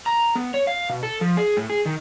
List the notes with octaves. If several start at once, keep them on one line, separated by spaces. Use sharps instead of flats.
A#5
B3
C#5
F5
B2
A4
F3
G#4
A2
G#4
D#3